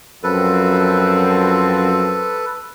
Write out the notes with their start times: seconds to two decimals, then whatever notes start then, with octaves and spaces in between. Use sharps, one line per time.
0.24 F#2 F3 C4 A4 B4